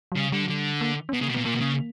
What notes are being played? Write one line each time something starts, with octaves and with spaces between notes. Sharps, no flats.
F#3
C#3 G3
D3 G3
F#3
D3
G3
A#3
C#4
B2 B3
C#3 A#3
B2
A#2 B3
A#2 A#3
B2
C#3